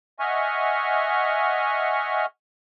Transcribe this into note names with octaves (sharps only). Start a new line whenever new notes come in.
D#5 E5 F#5 G#5 C#6 F6